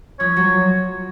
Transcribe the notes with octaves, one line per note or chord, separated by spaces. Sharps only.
F3 C#5
F#3